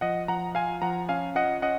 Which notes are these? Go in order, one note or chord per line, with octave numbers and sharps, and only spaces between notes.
F3 D#5 F#5
F3 F#5 A#5
F4 F5 G#5
F3 F#5 A#5
C#4 F5 G#5
F4 D#5 F#5
C#4 D#5 F#5